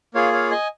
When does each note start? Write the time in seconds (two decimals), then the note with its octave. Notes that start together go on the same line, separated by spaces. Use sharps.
0.14 A#3 F4 G#4 C#5 F5
0.32 C#5 F5
0.51 D#5 G#5